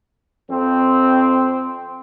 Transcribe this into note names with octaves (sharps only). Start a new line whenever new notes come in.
F2 C4